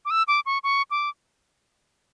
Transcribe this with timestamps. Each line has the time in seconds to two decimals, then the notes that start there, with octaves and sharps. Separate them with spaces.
0.05 D6
0.10 E6
0.28 D6
0.46 C#6
0.64 C#6
0.91 D6